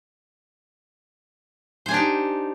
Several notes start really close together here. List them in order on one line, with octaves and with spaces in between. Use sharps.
C5 G#5 D4 G4 D#4